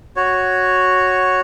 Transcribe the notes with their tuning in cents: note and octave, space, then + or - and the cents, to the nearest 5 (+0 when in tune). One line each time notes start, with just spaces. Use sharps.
F#4 +0 C#5 +0